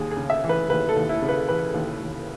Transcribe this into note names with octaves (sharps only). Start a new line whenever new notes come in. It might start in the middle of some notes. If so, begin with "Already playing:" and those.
Already playing: D#2 G#4
G#4
C#3
E5
E3
B4
D#2 B4
A4
D#2
E4
C#3
B4
E3 B4
D#2
D#2